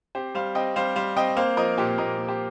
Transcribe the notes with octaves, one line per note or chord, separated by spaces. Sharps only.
C4 G4 C5
G3 C5 F5
C4 D#5 G5
G3 C5 F5
G3 C5 F5
C4 D#5 G5
A#3 C5 F5
F3 A#4 D#5
A#2 G4 C5
A#2 A#4 D#5
A#2
G4 C5